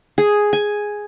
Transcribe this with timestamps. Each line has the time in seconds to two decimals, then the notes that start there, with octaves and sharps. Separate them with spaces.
0.18 G#4
0.53 G#5